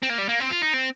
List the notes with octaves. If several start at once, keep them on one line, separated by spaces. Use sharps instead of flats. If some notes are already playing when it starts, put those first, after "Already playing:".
C4
A#3
G3
A#3
C4
F4
D#4
C4